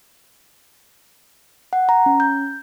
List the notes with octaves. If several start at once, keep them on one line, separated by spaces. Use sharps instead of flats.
F#5
A#5
C#4
G6